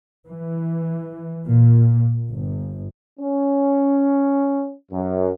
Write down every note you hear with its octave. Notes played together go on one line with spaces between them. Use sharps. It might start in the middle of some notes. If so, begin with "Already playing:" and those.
E3
A#2
G1
C#4
F#2